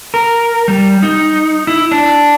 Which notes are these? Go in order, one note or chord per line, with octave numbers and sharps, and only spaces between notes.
A#4
G3
D#4
E4
D4